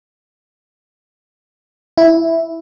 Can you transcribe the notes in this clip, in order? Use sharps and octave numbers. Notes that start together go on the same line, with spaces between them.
E4